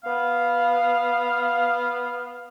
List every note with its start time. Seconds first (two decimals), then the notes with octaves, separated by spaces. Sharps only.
0.05 B3 F5